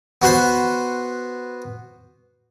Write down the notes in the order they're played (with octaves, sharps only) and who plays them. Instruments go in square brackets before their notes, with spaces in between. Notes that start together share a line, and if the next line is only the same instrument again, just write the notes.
[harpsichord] B3 F#4 C5 B5